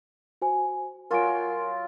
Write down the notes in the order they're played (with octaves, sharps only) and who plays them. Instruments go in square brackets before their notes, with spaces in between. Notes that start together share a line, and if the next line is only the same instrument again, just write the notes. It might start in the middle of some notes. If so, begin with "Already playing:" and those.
[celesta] F#4 C5 G#5
[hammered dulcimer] F#3 F4 [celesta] A#4 G#5 D7